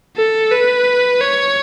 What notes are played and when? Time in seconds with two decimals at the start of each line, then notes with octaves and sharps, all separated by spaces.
0.16 A4
0.52 B4
1.21 C#5